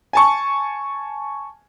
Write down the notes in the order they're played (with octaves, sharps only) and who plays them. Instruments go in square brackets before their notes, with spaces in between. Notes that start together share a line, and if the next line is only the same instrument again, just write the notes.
[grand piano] G#5 A5 C#6